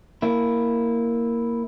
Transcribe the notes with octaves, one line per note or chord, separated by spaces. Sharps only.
A#3 E4